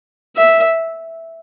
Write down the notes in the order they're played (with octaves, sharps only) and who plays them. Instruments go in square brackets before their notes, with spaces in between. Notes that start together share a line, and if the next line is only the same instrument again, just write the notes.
[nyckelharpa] E5